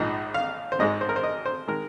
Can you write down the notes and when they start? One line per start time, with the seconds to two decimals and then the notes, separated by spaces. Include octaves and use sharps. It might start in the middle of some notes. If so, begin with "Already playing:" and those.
Already playing: A#1 G#2 F3 D#5
0.34 F5
0.72 C5
0.79 G#1 G#2 G#3 D#5
1.01 C5
1.09 A#4
1.16 C5
1.23 D#5
1.46 C5
1.68 D#3 G#3 A#4